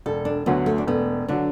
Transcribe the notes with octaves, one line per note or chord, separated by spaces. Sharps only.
E1 A4
D4
D2 D3 F#3 B3
A3
D4
E1 B3
D3 F#3 D4